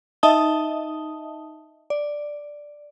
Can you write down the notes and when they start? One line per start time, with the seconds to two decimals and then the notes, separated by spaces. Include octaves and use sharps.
0.23 D#4 D#5 E5 A5 D#6 G7
1.90 D5